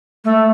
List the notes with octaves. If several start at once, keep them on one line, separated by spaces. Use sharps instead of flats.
A3